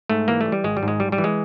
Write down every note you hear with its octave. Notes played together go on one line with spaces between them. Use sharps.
G#2 A3
E3 A#3
G3 A3
G3
G#1 G#3
G3
G#2
G#3
G3
G3
E3
G#3